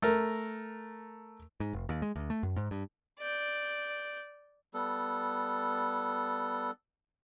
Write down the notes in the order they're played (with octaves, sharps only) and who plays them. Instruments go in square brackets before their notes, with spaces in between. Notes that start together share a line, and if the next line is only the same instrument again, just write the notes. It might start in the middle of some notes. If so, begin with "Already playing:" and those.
[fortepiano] A3 A#4
[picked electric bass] G#2
F1
D#2
G#3
D2
A3
F#2
G#2
G2
[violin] D5 G6
[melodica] G3 B3 A4